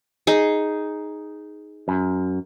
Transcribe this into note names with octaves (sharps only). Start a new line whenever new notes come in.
D#4 G#4
F#2